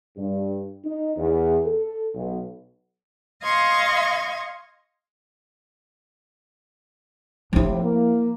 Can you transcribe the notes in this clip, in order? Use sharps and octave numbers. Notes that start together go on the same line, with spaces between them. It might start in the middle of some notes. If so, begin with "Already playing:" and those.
G2
D#4
E2
A4
B1
D#5 F5 C6 C#6 G#6
A2 C3 F3 C4 E4
A#3